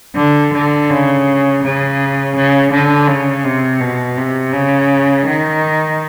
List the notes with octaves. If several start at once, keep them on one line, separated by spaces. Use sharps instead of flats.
D3
D3
C#3
C#3
C#3
D3
C#3
C3
B2
C3
C#3
D#3